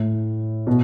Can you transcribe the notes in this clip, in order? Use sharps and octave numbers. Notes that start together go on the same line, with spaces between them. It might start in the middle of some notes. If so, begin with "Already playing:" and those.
Already playing: A2
B2